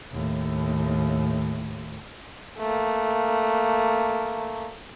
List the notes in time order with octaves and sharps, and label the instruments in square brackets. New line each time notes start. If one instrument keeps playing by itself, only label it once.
[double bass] D#2 A2
[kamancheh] A3 A#3